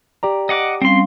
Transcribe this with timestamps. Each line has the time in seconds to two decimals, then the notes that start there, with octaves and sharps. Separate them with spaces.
0.23 G4 D5 A#5
0.49 D#5 F#5 D6
0.82 G3 C4 C#4 F5 C6